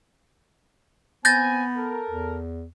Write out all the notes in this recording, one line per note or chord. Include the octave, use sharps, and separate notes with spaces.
B3 C4 G#5 G6 A6 A#6
A4 A#4
E2